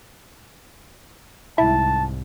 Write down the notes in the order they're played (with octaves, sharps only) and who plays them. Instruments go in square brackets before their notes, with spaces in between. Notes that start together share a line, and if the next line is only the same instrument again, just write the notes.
[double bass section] C2 G#2 [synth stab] E4 [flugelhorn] A5